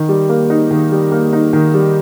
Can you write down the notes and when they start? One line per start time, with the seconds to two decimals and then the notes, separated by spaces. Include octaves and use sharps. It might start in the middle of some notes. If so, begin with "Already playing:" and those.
Already playing: D#3
0.09 G3
0.29 A#3
0.50 D#4
0.71 D#3
0.92 G3
1.12 A#3
1.33 D#4
1.53 D#3
1.74 G3